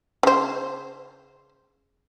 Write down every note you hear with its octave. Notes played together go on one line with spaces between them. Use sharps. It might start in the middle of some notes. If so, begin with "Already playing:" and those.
C#3 C5